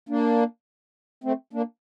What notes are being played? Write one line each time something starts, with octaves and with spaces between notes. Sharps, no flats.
A#3 D4
A3 C4
A#3 D4